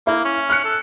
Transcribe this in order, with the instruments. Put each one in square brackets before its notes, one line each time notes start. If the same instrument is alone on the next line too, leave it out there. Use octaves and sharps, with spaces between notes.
[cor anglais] A#3 [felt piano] E4
[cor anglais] C#4
[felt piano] F6 F#6 C#7
[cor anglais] A4